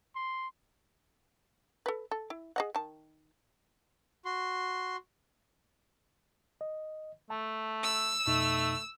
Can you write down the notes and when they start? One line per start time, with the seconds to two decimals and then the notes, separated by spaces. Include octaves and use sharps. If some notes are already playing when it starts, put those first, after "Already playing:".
0.16 C6
1.86 A4 B4
2.11 A4
2.30 E4
2.56 G#4 D#5 F#5
2.75 D#3 A5
4.25 F#4 C6
6.61 D#5
7.30 A3 A5
7.83 E6
8.27 F2 B2 A3 D#4